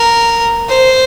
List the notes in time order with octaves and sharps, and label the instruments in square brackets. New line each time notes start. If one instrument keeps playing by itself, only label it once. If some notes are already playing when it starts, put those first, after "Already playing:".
Already playing: [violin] A#4
C5